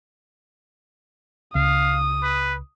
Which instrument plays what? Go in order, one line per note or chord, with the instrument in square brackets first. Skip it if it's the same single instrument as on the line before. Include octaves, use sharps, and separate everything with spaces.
[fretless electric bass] C#2 [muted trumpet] F5 [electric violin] D#6
[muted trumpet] B4